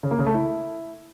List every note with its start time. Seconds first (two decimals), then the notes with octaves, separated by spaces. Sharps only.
0.03 C#3
0.11 A#3
0.19 C#3
0.26 A3
0.34 E4